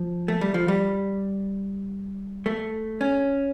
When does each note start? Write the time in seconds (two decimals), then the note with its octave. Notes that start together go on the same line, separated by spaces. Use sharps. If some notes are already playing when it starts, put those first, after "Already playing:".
Already playing: F3
0.28 A3
0.41 G3
0.54 F3
0.68 G3
2.46 A3
3.01 C#4